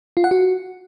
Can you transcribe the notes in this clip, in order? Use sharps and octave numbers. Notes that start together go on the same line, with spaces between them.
F4
F#5
F#4